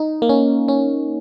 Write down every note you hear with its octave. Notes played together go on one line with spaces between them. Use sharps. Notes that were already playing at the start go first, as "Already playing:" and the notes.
Already playing: D#4
A#3
C#4
C#4